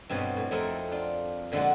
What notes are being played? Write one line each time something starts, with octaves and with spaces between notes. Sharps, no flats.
G2 B2 C4 B4 C#5 D#5
A2
F2 A3 C4 D#4 E4 A#4
D4 F4
A#2 D3 F3 G#3 F#4